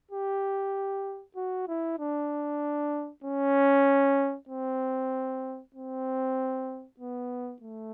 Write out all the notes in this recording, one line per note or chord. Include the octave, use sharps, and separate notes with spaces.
G4
F#4
E4
D4
C#4
C4
C4
B3
A3